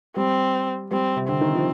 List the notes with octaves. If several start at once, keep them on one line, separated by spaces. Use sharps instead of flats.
G3 C4
G3 C4
C3
D3 C4
D#3
F3